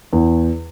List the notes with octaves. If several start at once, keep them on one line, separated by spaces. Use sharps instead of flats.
E2